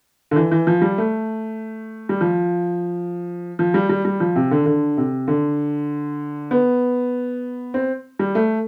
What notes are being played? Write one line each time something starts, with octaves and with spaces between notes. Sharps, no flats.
D3
E3
E3
F3
G3
A3
G3
F3
F3
G3
G3
G3
F3
C3
D3
D3
C3
D3
B3
C4
G3
A3